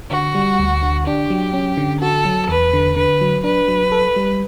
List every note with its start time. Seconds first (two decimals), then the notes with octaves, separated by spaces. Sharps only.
0.11 D3 F#4
0.35 G3
0.60 D2
0.83 D3
1.06 D4 G4
1.30 F#3
1.53 C#4
1.77 D3
2.01 F#4 A4
2.25 F#3
2.49 E2 B4
2.73 D3
2.96 D3 B4
3.21 F#3
3.44 D4 B4
3.68 F#3
3.92 A4
4.16 G3